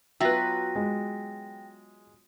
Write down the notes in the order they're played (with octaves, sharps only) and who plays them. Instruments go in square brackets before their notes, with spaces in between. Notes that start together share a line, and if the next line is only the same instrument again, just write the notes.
[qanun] F#3 B3 F4 [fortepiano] B4 E5 [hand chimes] G5 A#6
[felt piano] G#3